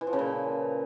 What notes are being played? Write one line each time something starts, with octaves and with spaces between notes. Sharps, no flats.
E3
F3
C#3
A#2